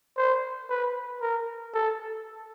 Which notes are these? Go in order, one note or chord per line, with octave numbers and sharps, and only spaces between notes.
C5
B4
A#4
A4